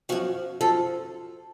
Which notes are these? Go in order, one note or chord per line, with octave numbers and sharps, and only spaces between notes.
F#2 F3 F#4
F#2 F3 A4